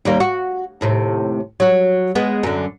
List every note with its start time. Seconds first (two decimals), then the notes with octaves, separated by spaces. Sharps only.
0.05 D#2 G3 A#3
0.20 F#4
0.81 D#2 A2 C3
1.60 F#3 F#4
2.15 G#3 B3
2.43 F#2 D3